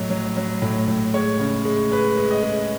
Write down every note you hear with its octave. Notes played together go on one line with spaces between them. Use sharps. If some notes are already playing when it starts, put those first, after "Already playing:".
Already playing: A2 F#3 D#5
F#3
F#3
A2
A2
G#3 C#5
C#3
G#3
G#3 B4
G#3
D#5
G#3